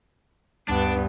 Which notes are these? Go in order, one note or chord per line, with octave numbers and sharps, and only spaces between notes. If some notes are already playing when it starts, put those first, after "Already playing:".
D2 G2 B3 D4